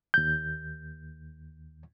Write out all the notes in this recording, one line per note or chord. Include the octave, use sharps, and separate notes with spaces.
D#2 G6